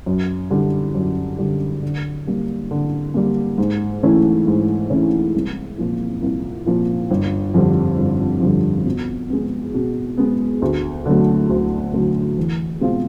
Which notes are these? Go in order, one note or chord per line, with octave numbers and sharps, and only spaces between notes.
F#2
D3 G3
F#2
D3 G3
D3
G3 A#3
D3
G3 A#3
G#2
E3 A3 C#4 E4
G#2
E3 A3 C#4 E4
C2
A#2 F3 A#3
C2
A#2 F3 A#3
G1
F2 D3 G3
G1
F2 D3 G3
B2
G#3 B3
B2
G#3 B3
D2
D3 F#3 A3
D2
D3 F#3 A3
E2
B2 G#3 C4 F4